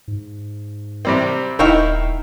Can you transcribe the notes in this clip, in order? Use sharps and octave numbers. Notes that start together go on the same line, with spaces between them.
G#2
C3 G3 C4
D#1 D#4 E4 A#4 C#5 F5 G5